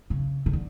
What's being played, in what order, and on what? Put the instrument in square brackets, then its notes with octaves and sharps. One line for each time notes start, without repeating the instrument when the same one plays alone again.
[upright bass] C#3
C#3
D3